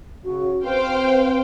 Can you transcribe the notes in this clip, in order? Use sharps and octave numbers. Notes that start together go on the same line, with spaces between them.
C#3 F#4
C4 B4 C5 F5 G5